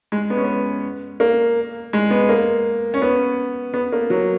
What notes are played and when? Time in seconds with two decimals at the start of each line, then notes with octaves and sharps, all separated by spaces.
0.12 G#3
0.30 B3
0.37 C#4
0.44 B3
1.20 A#3
1.93 G#3
2.10 B3
2.29 A#3
2.94 C#4
3.02 B3
3.74 B3
3.92 A#3
4.10 F#3